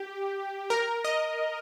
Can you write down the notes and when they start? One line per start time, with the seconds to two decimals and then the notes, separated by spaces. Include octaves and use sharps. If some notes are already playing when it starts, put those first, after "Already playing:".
Already playing: G4
0.70 A#4
1.04 D#5